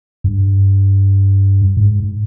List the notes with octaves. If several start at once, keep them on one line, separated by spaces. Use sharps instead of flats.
G2
G#2